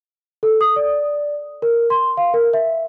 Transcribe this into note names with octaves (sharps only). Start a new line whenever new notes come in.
A4
D#6
D5
A#4
C6
F5
A#4
E5